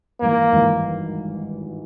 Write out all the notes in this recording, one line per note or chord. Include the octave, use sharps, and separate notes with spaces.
G#1 G2 E3 A#3
G#1 G2 E3